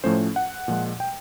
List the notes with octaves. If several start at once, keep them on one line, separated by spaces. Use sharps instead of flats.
A2 F3 A3 C#4 C5
F#5
A#2 F3 G#3
G5